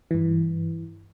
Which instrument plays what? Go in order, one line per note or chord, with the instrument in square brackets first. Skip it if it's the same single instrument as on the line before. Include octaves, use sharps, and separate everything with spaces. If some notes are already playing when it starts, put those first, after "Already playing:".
[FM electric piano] G2 E3